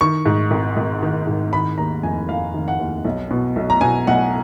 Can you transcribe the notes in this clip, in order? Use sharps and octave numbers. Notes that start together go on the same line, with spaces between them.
D#3 C#6
G#2
G#1
G#1
D#3
G#2
D#3 B5
D#2 A#5
F1 G#5
F1 F5
D#3
F#5
D#2
B1
B2
B1
A#5
B2 G#5
B1 F#5